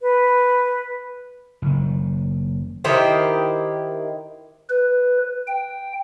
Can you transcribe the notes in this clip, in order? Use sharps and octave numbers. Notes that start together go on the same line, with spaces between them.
B4
F#1 D#3
D#3 E4 G4 C5
B4
G5